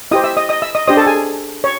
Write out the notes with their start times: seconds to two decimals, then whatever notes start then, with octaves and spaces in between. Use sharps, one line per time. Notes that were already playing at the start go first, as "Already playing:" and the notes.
0.11 E4 G4 C5 D#5 D#6
0.24 E5 E6
0.37 D#5 D#6
0.49 D#5 D#6
0.62 E5 E6
0.75 D#5 D#6
0.87 D4 G4 C5 D#5 D#6
0.97 A4 A5
1.06 G#4 G#5
1.64 C#5